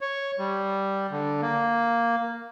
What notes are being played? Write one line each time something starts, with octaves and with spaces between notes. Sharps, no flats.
C#5
G3
D3
A#3